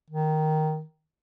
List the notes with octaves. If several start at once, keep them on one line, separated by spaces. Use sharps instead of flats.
D#3